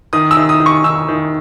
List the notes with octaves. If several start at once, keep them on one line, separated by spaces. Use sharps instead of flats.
D#3 D#6
E6
D#3
D#6
D#3
C#6
D#3 E6
D#3